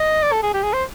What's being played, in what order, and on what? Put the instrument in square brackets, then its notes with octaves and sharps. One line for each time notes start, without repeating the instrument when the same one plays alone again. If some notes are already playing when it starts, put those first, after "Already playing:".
Already playing: [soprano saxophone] D#5
D5
A4
G#4
G4
G#4
C5